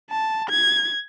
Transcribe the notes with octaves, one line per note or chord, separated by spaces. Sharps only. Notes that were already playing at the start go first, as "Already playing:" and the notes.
A5
G#6